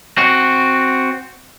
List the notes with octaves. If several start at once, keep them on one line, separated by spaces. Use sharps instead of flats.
C4 F#4